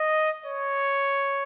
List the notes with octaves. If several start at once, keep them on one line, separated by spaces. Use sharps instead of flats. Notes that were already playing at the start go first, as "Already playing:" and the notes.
Already playing: D#5
C#5